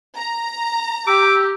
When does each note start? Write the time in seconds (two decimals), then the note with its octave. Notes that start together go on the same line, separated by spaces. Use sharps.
0.17 A#5
1.07 G4 D6 E6